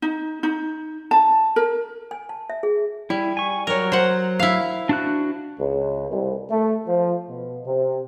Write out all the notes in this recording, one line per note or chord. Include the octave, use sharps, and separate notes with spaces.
D#4
D#4
A5
A#4
G#5
A5
E5
G#4
G3 E4
G#5 C#6
F#3 A#4 C#5
C5 F#5
E4 F5
D4 F#4 F#6
C#2
C2
A3
F3
B2
C3